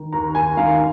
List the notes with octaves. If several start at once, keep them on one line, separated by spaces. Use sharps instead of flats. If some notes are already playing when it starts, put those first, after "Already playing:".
Already playing: D#3
D#2 A#5
D#2 G#5
D#3 F5